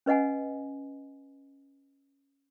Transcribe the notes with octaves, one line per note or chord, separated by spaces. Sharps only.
C#4 B4 D#5 F#5 G#5